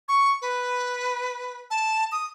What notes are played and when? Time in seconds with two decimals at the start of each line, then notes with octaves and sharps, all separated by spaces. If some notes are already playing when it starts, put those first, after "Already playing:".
0.08 C#6
0.42 B4
1.71 A5
2.12 D#6